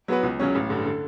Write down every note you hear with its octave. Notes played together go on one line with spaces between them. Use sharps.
F#3 B3 F#4 B4
C#2
C#3 F#3 C#4
A1
G2 D3
D3